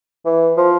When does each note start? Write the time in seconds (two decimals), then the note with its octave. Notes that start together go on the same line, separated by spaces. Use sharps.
0.26 E3
0.57 F3